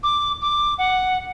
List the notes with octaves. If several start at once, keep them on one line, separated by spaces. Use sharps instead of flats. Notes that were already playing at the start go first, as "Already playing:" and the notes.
D6
D6
F#5